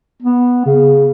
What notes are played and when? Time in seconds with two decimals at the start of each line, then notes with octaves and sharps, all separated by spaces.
0.23 B3
0.66 C#3